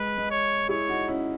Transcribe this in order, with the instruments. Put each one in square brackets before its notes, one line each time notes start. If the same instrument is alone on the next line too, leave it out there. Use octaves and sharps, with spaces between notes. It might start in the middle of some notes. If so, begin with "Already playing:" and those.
Already playing: [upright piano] G#3 [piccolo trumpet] B4
[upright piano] G#3
[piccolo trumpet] C#5
[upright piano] E4 G#4 [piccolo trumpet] C#5
[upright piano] D#4 F#4
C#4 E4